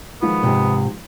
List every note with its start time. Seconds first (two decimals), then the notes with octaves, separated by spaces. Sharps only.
0.22 D#3 F3 G#3 B3
0.43 G#2 C3